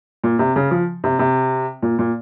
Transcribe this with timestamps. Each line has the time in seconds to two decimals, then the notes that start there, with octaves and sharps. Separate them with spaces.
0.24 A#2
0.39 C3
0.56 C#3
0.71 F3
1.04 C3
1.19 C3
1.82 A#2
1.99 A#2